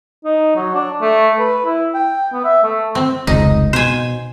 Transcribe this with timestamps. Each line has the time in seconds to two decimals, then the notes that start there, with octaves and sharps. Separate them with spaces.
0.24 D#4
0.56 F#3
0.75 D4
1.02 A3
1.39 B4
1.66 E4
1.94 G5
2.33 B3
2.44 E5
2.63 A3
2.95 C4
3.27 F1 C#2 D#4
3.73 B2 C5 G#5